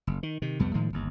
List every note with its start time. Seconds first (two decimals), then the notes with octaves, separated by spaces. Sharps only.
0.07 F#1
0.23 D#3
0.42 C3 D#3
0.59 C2 F2 G3 B3
0.74 A2 D#3 F3 G#3
0.93 G1 D#2